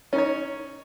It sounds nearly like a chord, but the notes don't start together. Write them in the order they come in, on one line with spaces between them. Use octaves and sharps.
C#4 D#4 C#5